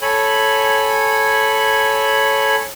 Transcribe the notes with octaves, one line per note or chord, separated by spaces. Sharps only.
A4 C#5 G#5 B5